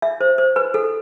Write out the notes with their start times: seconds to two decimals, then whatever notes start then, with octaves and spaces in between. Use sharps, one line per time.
0.02 E5
0.21 C5
0.38 C5
0.56 B4
0.74 A4